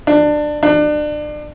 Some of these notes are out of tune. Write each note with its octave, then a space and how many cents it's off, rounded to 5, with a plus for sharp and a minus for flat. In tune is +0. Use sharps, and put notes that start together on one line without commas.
D4 +20
D4 +30